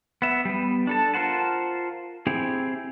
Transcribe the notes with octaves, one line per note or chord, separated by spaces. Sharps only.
B3 E5
G3 B3
D4 A4 A5
F4 A#4 C5 F#5 A5
C4 E4 G4 G#4